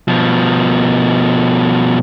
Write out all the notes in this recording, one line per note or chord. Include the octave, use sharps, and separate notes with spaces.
B2 F3